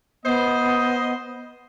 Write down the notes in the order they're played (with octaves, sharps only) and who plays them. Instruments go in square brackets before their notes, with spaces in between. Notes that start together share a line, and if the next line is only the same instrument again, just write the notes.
[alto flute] B3 [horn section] C5 D#5